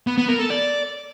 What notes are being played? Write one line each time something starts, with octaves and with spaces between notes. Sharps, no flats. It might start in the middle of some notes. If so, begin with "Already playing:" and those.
B3
B3
A#4
A4
D5